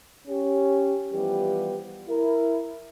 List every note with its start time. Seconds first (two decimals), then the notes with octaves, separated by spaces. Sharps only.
0.28 C#4 G4
1.13 E3 F3 G3 B3 G4 B4
2.08 E4 A#4